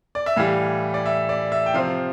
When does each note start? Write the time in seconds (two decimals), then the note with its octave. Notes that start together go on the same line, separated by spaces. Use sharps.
0.15 D5
0.26 E5
0.36 A2 E3 G3 F5
0.94 D5
1.06 E5
1.29 D5
1.52 E5
1.66 G5
1.74 C3 F3 C4 F5